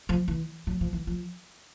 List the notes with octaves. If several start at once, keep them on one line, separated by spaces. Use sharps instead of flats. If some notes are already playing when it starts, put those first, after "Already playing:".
F3
E3
F#3
F3
E3
F3